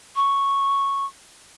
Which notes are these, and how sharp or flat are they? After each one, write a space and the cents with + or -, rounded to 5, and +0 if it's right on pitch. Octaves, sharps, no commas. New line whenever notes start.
C#6 -5